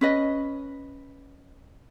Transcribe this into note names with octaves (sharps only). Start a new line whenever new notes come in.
C#4 B4 D#5